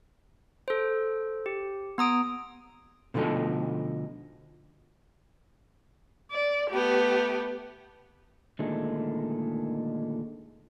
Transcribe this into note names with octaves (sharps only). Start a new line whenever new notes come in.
A4 C5
G4
B3 A#5 D#6 D7
B2 D3 F3 A3 D#4 A4
D5
A3 B3 G4
A#2 D3 D#3 G#3 A3